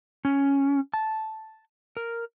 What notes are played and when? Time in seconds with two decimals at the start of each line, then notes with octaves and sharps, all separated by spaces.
0.25 C#4
0.94 A5
1.97 A#4